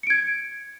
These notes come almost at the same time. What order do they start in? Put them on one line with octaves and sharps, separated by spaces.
C#7 D7 G#6